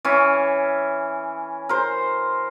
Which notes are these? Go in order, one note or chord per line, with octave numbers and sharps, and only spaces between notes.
E3 C#4
A#4 C5